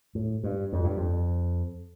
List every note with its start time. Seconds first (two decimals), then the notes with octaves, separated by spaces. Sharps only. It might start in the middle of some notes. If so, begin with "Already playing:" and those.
0.15 A2
0.44 G2
0.73 F2
0.84 G2
0.97 F2